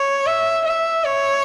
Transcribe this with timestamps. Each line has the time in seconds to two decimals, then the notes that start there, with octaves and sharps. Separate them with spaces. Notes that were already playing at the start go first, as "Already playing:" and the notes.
Already playing: C#5
0.26 E5
0.65 E5
1.04 C#5